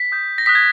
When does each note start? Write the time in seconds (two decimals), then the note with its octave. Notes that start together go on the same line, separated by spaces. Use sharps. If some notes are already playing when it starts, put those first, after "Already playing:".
Already playing: B6
0.12 D#6 G6
0.38 A#6
0.46 D#6 F#6 B6
0.55 G#6